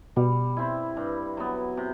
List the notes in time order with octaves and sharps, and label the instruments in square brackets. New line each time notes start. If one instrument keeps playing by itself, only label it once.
[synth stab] B2 [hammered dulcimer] G3
[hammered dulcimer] C4 E4
G2
F#3 B3
C3